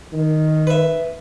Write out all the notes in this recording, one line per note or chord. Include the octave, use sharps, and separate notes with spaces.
D#3
B4 E5